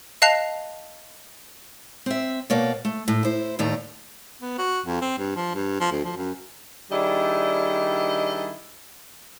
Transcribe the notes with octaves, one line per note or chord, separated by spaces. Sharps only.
D#5 F5 A5 F#6 C7 F7
C4 E5
B2 A#3 C#5 D5
A3
A2
E4 C5
D#2 A2 D#3 D5 A#5
B3
F#4
F2
C4
G2
F3
G2
F3
D2
F3
F#2
D#3 G3 D4 E4 G#4 D#5